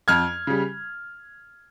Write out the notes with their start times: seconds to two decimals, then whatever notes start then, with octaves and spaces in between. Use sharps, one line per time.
0.08 F2 F6 G#6
0.47 C#3 G3